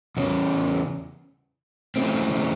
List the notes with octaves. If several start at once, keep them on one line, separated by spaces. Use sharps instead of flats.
E2 C#3 C#4
C#3 E3 A3 C4